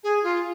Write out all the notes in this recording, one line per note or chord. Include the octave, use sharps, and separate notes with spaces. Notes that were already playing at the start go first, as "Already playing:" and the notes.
G#4
F4